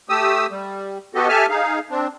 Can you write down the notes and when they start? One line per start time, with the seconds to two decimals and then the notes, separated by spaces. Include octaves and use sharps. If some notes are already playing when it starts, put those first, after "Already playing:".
0.09 A3 G4 D#6 E6
0.51 G3
1.15 B3 F#4 G4 A4 D#5
1.29 G4 A4 E5 G#5 A5 F6
1.50 D#4 G#4 F5
1.91 C4 D4